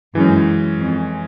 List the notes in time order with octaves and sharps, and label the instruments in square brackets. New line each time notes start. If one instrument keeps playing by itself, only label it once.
[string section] F#2 [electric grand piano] E3 G#3 C#4
[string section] F2